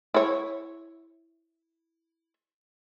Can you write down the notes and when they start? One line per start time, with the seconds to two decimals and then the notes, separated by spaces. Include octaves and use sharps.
0.14 E4 C#5